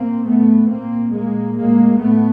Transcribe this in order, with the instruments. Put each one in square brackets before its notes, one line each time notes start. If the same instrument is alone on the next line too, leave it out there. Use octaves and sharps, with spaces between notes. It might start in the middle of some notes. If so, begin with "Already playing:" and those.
Already playing: [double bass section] A#2 A#3 C4
A2 A3 B3
A#2 A#3 C4
A#2 G#3 A#3
A2 G#3 A#3
A2 A3 B3